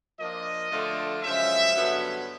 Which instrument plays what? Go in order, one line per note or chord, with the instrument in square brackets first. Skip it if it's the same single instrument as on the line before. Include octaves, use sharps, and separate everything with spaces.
[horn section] F3 A#3 D4 F4 D#5
D3 F3 A3 D4 F4
F#2 C#3 F3 G#3 C#4 E5
G2 D3 F#3 B3